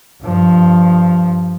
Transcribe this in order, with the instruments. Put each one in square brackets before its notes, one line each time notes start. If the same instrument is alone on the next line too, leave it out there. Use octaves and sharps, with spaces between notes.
[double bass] G2 F3